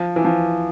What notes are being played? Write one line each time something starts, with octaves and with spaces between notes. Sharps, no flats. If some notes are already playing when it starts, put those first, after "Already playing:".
Already playing: F3
E3
F3